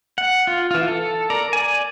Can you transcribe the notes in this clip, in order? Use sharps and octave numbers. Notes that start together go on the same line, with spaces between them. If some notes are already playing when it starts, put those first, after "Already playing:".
F#5
F4
E3 F4
A4
A#4 D5 A#5
D5 G#5